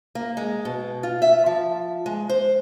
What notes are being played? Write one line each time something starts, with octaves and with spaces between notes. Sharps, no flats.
A#3
G#3
B2
F4
E5
F3
G#3
C5